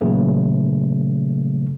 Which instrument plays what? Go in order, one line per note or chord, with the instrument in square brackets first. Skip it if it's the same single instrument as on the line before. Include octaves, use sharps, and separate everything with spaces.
[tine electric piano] A#2 C#3 E3 F#3 A3 A#3